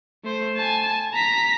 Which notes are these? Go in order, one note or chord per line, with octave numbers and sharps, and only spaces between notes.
A3 C5
G#5 A5
A#5 B6